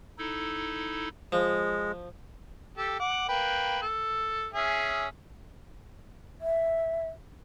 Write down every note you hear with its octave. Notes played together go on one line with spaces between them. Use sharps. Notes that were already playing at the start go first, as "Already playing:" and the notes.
D#4 E4 A4
F3 G#3
G4 A4
F#5 D6
A#3 B4 G5
A4
C#4 G#4 E5
E5